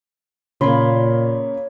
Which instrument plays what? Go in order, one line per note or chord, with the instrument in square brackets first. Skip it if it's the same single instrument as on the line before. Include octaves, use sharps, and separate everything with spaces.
[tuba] A#2 [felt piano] C#3 A#3 [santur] C#5 [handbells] B5 C6